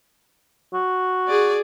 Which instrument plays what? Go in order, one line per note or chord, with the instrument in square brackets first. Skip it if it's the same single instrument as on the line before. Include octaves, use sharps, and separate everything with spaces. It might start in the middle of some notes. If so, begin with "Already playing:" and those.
[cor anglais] F#4
[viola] G#4 D5